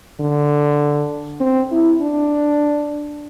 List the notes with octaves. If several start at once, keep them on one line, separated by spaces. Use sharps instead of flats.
D3
C4
E4
D4